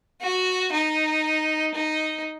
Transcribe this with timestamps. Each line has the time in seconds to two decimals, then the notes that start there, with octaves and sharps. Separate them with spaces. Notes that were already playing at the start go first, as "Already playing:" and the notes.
0.21 F#4
0.73 D#4
1.74 D#4